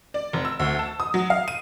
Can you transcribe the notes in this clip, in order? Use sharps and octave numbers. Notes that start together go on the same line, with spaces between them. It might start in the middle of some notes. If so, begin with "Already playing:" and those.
D5
F1
E6
D2
A5
D#6
F#3
F5
D#7